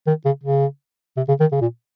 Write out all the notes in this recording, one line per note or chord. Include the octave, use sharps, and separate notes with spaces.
D#3
C#3
C#3
C3
C#3
D#3
C#3
A#2